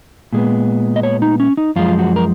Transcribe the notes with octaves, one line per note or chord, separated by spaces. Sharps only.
A#2 G#3 B3
D#5
C#5
D#4
C#4
D#4
F#2 F3 G#3 F4
F#4
A#4